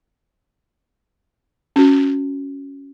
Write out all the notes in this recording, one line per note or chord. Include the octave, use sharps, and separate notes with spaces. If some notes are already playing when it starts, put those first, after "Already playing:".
C#4 F#4